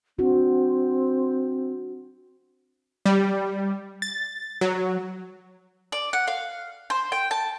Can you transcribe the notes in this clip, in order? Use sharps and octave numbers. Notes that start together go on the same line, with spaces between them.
C4 D4 F#4
G3
A6
F#3
D5
F#5
F5
C5
G5
A5